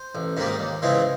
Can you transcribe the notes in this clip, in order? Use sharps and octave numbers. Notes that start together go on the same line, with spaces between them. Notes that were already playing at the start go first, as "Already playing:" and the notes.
Already playing: C5
A1
G#2 D#3 G3 A#3
D#2
C#3 E3 G#3 C4